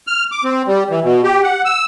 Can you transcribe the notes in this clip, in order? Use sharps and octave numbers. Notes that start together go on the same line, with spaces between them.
F6
D6
C4
G3
E3
B2
G4
F#5
E6